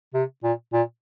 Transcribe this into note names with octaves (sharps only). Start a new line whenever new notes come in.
C3
A#2
A#2